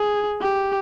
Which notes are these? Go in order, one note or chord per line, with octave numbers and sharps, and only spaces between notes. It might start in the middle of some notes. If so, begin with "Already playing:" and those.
Already playing: G#4
G4